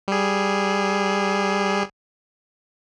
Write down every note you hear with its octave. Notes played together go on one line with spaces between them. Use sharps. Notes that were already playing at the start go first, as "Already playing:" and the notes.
G3 G#4